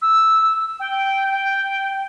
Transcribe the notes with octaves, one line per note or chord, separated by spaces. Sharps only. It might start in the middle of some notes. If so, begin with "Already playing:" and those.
E6
G5
G5